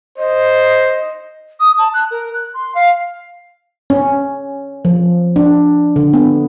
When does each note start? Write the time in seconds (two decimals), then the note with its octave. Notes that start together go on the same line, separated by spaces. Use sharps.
0.18 C5 D#5
1.60 D#6
1.78 A5
1.94 F#6
2.11 A#4
2.34 F#6
2.54 C6
2.75 F5
3.90 C#4
4.85 F3
5.36 D4
5.96 D3
6.14 B3